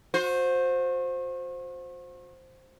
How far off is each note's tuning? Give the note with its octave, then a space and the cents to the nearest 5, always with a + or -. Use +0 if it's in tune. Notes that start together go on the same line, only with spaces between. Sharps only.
F#4 -40 C5 +0